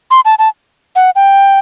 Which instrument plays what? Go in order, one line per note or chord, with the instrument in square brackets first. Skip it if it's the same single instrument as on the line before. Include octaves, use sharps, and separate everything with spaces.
[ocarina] C6
A5
A5
F#5
G5